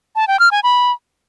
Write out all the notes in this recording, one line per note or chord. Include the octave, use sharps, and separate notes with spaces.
A5
G5
F6
G#5
B5